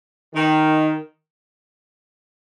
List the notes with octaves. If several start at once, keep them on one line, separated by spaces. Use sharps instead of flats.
D#3